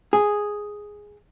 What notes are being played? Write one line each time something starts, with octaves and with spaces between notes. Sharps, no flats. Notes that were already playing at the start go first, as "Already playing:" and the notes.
G#4